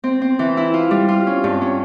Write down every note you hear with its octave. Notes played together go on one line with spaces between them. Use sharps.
C4
C4
E3
E4
F4
G3
F4
C#4
G2
C#4